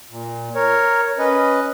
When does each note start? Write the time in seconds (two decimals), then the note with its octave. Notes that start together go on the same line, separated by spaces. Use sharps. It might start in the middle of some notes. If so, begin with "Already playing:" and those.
0.10 A#2
0.55 A#4 C#5
1.18 C#4 B4 D#5